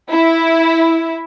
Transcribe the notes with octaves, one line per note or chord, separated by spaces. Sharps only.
E4